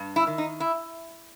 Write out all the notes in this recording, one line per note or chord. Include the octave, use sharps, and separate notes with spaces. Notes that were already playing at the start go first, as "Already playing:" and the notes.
Already playing: G2
E4
D#3
D#4
E4